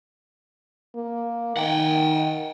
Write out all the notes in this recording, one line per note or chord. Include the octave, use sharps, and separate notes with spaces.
A#3
D#3 F#5 G5